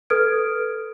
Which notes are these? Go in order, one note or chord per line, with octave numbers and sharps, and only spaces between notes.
A4 B4 D#6 F6 G#6 D7